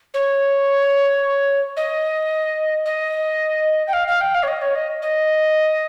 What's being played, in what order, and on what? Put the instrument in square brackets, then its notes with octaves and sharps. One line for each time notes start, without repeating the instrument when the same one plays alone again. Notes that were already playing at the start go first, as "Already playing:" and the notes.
[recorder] C#5
D#5
D#5
G5
F5
F5
G5
F5
C#5
D#5
C#5
D#5
D#5